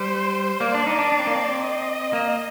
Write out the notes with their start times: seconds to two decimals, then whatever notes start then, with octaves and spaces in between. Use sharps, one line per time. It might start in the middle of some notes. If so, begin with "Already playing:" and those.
Already playing: G3 C5
0.60 A#3 D5
0.74 D4
0.87 D#4
0.99 D4
1.12 D4
1.19 C4
1.27 A#3
1.35 C4
1.62 D#5
2.13 A#3